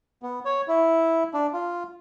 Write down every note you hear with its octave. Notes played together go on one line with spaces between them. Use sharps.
B3
C#5
E4
D4
F4